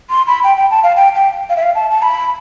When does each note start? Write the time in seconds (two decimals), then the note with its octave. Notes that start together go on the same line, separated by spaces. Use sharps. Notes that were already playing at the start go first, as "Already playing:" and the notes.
0.10 C6
0.27 B5
0.44 G5
0.57 G5
0.71 A5
0.83 F5
0.96 G5
1.15 G5
1.49 F5
1.57 E5
1.63 F5
1.75 A5
1.91 A5
2.02 B5